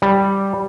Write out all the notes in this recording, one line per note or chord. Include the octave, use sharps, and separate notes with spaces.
G3